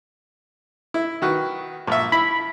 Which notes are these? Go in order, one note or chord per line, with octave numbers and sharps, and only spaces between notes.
E4
D#3 F#4 B4
A#1 E5
E4 B5